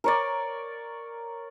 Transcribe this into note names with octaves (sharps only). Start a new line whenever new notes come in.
A#4 C#5 D5